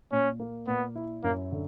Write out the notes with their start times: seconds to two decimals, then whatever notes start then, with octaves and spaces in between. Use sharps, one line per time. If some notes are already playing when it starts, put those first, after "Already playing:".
0.12 A#2 C#4
0.40 A#3
0.67 A#2 B3
0.96 E4
1.24 F#2 A#3
1.52 D3